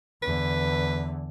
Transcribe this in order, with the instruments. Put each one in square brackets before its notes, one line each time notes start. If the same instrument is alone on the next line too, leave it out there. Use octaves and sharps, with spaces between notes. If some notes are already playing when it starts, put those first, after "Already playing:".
[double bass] E2 D3 [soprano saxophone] B4